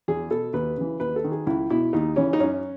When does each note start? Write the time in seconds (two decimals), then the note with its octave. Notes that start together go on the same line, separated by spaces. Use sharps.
0.08 E2 G#4
0.30 B2 A4
0.53 D#2 B4
0.77 C#3 E3
1.00 D#2 B4
1.16 A4
1.24 D#3
1.32 G#4
1.46 C#2 E4
1.70 B2 E4
1.93 D#2 D#4
2.16 C#3 E3 C#4
2.33 D#4
2.40 F#2 C#4